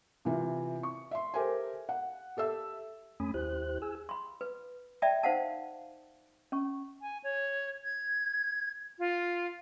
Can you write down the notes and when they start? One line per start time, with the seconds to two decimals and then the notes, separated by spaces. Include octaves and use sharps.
0.25 C3 E3 F4
0.83 C#6
1.11 E5 C6
1.34 G4 A4 A#4 C5 E5 G#5
1.89 F#5
2.37 G4 A4 E5 E6
3.20 F2 A3 C#4 G#5 B5 D#6
3.34 D#2 E4 G4 C5 F#6
3.82 G#4 G#5 E6
4.09 B5 C6
4.41 B4
5.02 D5 E5 G5 A5 B5
5.23 D#4 C5 F5 F#5 A5
6.52 C#4 C#6
7.01 G#5
7.23 C#5
7.84 G#6
8.99 F4